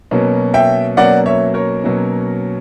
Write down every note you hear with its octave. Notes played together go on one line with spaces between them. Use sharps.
B2 F#3 A#3 C#4
E5 G5
B2 F#3 A#3 C#4 D5 F#5
C#5 E5
A#4 C#5
B2 F#3 A#3 C#4